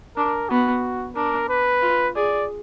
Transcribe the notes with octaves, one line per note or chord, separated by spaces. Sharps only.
D4 A#4
B3 F#4
D4 A#4
B4
F4
G#4 D5